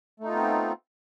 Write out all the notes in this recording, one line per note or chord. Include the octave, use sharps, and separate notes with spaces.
A3 B3 C4 D#4 F4